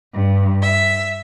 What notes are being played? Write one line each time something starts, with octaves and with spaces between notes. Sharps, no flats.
G2
E5